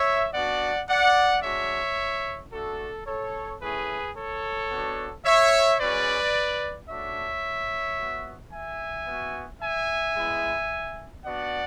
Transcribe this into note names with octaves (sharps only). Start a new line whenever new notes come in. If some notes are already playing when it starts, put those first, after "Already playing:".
Already playing: C#5 E5
B3 D4 F#4 D5 F#5
D5 F#5
G#3 D4 F#4 C#5 E5
A3 D4 F#4 A4
A4 C#5
A3 C#4 E4 G#4 B4
A4 C#5
B3 D4 F#4
C#5 E5
G#3 C#4 F#4 B4 D5
A3 D4 F#4 C#5 E5
B3 F#4
E5 G#5
B3 F#4
E5 G#5
G#3 B3 E4
B3 D4 F#4 D5 F#5